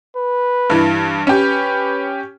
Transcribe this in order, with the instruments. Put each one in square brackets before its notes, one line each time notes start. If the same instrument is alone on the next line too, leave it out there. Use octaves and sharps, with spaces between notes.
[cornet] B4
[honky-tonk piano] G2 E3
[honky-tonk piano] C#4 G4 [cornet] B4